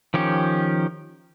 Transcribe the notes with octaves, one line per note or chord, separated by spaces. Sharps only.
D#3 F3 C#4 G4